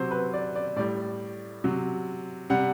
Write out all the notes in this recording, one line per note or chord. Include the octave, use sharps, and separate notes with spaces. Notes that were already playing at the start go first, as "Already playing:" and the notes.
Already playing: C3 F#3 C5
B4
D5
D5
A2 G3 D5
C3 F#3
C3 G3 F#5